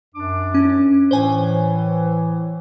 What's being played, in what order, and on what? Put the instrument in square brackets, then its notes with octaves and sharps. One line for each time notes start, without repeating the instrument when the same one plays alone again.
[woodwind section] F#2 D4 D6
[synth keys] C#4
[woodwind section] A2 E3 [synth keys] C5 C#5 G#5